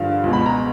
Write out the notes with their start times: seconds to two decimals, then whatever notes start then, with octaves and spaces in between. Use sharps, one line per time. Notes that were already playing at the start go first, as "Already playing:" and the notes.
Already playing: G2 D3 F3 F5
0.24 C#2 B2
0.33 B5
0.46 A#5